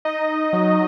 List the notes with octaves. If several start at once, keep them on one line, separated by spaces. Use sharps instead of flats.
D#4 D#5
F#3